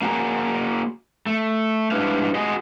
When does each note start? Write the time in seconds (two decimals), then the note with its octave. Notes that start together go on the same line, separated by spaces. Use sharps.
0.01 A#3 F#4 G#4 A#4
1.26 A3
1.91 G#2 G3 D4 E4 B4 F5
2.35 F#4 G#4 D#5